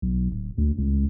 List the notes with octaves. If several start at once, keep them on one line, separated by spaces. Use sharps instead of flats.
B1
D1
D2
C#2